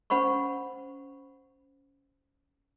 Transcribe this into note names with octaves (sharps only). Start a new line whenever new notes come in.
C#4 C5 F#5 B5 C#6